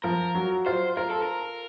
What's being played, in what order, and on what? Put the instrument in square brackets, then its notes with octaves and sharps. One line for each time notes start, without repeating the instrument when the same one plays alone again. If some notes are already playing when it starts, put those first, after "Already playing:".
[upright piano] F3 [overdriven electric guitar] A#4
[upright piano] F#3
[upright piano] F4 [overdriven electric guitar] C5
[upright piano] F4 [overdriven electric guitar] A#4
[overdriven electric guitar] A4
A#4